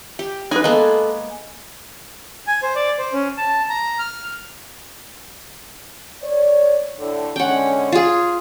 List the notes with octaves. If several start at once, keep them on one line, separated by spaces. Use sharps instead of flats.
G4
D#4 G#4 B4 G#5
G#3 A#3 B3 A4
G#5
C5
D5
C5
C#4
A5
A#5
F6
C#5 D5
A2 D3
D3 G#3 C#4 F#5 G5
F4 G#4